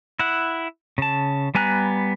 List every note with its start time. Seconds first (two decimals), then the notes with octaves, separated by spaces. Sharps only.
0.19 E4 F#5
0.98 C#3 A5
1.55 G3 B3 G#5 A#5 F#6